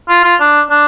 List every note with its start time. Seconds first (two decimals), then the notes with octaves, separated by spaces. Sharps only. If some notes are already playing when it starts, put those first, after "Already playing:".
0.09 F4
0.24 F4
0.40 D4
0.70 D4